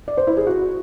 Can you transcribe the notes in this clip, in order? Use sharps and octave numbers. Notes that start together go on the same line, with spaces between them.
D5
C5
E4
G#4
F#4